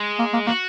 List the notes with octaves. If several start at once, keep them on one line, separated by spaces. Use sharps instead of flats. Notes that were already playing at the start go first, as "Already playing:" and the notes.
Already playing: G#3
A#3
A#3
A#3 F#4